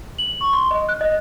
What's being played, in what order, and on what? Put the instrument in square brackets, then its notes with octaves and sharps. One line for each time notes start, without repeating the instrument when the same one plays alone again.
[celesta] F#7
C#6
C6
D#5
F#6
D#5